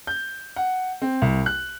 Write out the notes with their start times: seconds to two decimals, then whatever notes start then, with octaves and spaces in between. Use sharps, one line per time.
0.07 G6
0.56 F#5
1.02 C4
1.22 C2
1.46 F#6